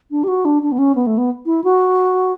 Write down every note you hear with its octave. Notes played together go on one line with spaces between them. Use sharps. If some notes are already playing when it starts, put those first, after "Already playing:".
D4
G4
F#4
D4
D4
B3
C#4
B3
A3
B3
E4
F#4